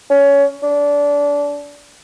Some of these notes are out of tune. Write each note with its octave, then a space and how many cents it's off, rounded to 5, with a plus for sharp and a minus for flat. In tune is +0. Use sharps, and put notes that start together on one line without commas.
C#4 +20
D4 -25